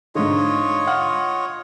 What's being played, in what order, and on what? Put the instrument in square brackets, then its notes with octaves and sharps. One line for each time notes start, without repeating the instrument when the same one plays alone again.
[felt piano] G#2 D3 [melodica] F4 C#5 D#5
[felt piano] F5 F#5 F6